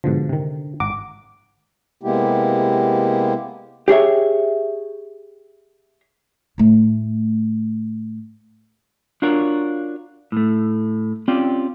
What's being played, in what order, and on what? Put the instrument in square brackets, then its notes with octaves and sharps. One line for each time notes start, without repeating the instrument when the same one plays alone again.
[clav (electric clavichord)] G#2 B2 F3 [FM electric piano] D3
[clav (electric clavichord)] C3 D#3
[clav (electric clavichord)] G#1 F#5 A#5 [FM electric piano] D6
[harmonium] C3 G#3 A#3 B3 E4 G4
[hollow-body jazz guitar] G4 G#4 C#5 E5
[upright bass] A2 A3
[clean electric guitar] D4 F4 F#4 A#4 C#5
A2 A3
C4 C#4 F4 G4 D5 G5